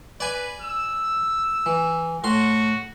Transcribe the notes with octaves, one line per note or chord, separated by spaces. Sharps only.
B4 D5 G#5
E6
E3
A2 F#4 C6